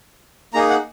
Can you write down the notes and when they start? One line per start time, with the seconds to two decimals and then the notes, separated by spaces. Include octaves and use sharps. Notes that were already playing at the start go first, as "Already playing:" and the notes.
0.54 A#3 D#4 G#4 A#5
0.70 F#5